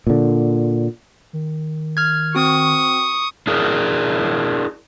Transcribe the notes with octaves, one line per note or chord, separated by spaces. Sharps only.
A#2 D3
D#3
F6 G#6
C4 F#4 C#6 D#6
D4 E4 G#4 A#4